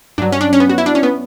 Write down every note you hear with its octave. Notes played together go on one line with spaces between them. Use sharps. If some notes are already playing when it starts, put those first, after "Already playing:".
G2 F#3 D4
C#4
D4
C#4
B3
F#4
E4
D4
C#4
B3